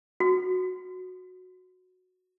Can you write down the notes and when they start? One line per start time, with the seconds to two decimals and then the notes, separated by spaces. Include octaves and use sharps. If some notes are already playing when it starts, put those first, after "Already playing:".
0.20 F#4